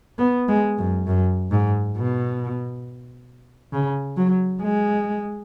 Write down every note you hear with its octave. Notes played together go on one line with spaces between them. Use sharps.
B3
G#3
F#2
F#2
G#2
B2
C#3
F#3
G#3